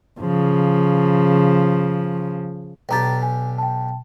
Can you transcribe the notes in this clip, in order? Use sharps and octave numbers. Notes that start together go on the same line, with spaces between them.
C#3 F3
B1 D4 G4 G5 A#5 A6
G#5
G5 A5